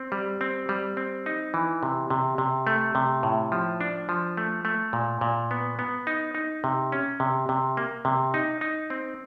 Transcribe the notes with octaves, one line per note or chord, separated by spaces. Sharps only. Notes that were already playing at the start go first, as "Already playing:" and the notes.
Already playing: C4
G3
C4
G3
C4
D#4
E3
C3
C3
C3
A3
C3
A2
F3
D4
F3
A3
A3
A#2
A#2
B3
B3
D#4
D#4
C3
C#4
C3
C3
A#3
C3
D#4
D#4
C4